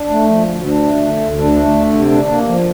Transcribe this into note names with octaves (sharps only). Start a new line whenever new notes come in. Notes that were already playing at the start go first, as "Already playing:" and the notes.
Already playing: D4
A3
F3
D2
D4
A3
D3
D2
D4
A3
D3
C3
D4
A#3
F3